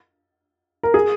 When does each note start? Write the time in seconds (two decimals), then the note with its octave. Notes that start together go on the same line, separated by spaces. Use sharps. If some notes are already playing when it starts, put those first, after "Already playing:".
0.83 A#4
0.94 G#4